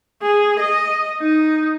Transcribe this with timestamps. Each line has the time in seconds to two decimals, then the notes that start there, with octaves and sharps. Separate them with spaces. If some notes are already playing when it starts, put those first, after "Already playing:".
0.23 G#4
0.60 D#5
1.20 D#4